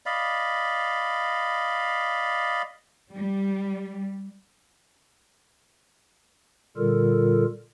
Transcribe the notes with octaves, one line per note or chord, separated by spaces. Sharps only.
D5 D#5 F5 B5
G3
A#2 D3 G3 F4 A4 A#4